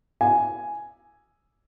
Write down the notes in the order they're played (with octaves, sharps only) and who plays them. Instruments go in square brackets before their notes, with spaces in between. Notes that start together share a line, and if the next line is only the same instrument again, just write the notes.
[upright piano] G#5